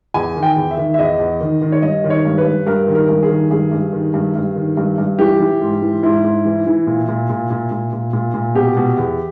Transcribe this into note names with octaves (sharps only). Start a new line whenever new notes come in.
E2 G#5
D#3
G5
E2
E5
D#3
E5
E2 D#5
E2
D#3
D#3
C#5
G2 D#5
D#3
C#5
G2
B4
G2
G2 A#4
D#3
A#4
G2
G#4
D#3
G2 G#4
G2
D#3
G2
G2
D#3
G2
G2
E3 G4
E3
G#2
E3
G#2 E4
G#2
E3
E3
A#2
A#2
A#2
A#2
A#2
A#2
A#2
A#2
B2 G4
B2
E2